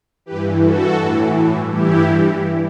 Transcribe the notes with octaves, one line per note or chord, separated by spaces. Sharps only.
G2 E3 G4 B4
F#4 A4
A2 E3
G2 E3 E4 G4